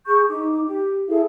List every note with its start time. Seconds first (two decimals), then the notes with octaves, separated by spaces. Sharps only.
0.07 G#4 C#6 G6
0.29 D#4 D6
0.66 G4
1.08 E4 G#4 A4 F5